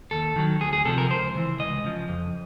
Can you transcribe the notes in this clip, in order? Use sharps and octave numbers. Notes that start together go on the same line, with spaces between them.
D#2 A4
D#3 F#3
D2 G#4
G#4
C3 F3 A4
A#4
C#2 C5
C#3 E3
C#2 D#5
C#3 F3
F2